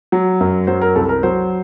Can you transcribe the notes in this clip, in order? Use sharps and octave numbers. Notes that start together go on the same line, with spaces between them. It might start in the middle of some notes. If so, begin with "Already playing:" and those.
F#3
F#2
F#3 C5
A#4
C2 A4
A#4
F#3 C5